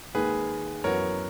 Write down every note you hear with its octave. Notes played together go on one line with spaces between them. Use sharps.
D#2 D#3 G#3 G#4 B4
F#2 E3 B3 F#4 A#4 C#5